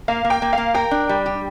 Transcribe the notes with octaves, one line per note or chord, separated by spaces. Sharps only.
A#3 F5
A#3
G5
A#3
A#3 F5
A#4 G5
D4
G3
G4